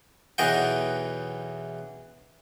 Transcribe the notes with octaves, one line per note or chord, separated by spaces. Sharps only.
B1 E2 E3 D#5 F#5 G5